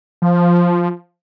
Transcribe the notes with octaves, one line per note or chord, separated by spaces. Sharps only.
F3